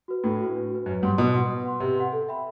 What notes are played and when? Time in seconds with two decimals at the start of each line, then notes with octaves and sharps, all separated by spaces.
0.08 F#4 B4
0.23 A2 D4
0.40 F#4 B4
0.55 D4
0.70 F#4 B4
0.86 F#2 B4
1.02 G2 F#5 C6
1.18 B2 B4
1.34 F#5 C6
1.50 B4
1.65 F#5 C6
1.80 C3 B4
1.96 F#5 C6
2.13 A4
2.28 E5 G5 B5